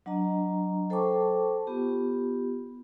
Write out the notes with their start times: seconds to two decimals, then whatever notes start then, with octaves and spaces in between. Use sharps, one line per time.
0.06 F#3 D4 D#5 A#5
0.90 A4 C5 G5 A5 C#6 D6
1.67 B3 F4 G4